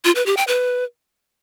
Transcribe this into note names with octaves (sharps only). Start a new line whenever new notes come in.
F4
B4
G4
G5
B4